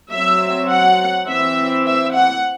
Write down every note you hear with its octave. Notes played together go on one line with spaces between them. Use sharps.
F#3 C4 E5
F#5
E3 C4 E5
E5
F#5